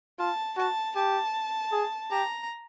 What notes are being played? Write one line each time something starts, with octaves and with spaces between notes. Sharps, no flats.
F4 A5
F#4 A5
G4 A5
G#4
G4 A#5